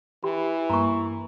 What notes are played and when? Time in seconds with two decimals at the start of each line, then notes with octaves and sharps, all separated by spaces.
0.24 E3 G4 B5
0.70 G2 A#3 A#5 C#6